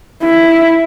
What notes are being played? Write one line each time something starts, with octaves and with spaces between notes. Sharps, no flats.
E4